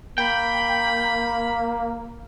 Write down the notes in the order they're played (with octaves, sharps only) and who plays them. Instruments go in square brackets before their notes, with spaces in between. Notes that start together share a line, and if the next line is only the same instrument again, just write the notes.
[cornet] A#3 [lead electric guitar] G5 [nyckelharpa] B5